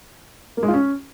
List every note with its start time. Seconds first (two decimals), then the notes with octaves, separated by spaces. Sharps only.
0.57 A#3
0.63 G#3
0.68 F4
0.74 C#4